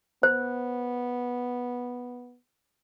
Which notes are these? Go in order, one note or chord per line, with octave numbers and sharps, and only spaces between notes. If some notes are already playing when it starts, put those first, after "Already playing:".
B3 C5